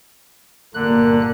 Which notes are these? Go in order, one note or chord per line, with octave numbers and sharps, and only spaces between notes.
G1 A#2 D3 A#3 F#6